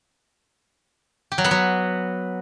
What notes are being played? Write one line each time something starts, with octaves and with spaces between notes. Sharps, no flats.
G4
F#3
B3
F#3